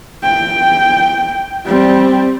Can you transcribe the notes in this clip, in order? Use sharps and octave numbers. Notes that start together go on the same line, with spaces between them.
G5
G3 C4